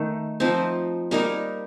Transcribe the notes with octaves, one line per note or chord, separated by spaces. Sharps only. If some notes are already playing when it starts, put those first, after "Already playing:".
Already playing: D#3 A3 D#4
F3 C4 D#4
G3 A#3 D#4 A#4